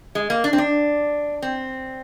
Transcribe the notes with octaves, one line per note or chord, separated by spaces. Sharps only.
G#3
A#3
D4
C4
D4
C4